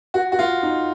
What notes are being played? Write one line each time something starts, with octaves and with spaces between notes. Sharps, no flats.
F#4
F#4
F4
D#4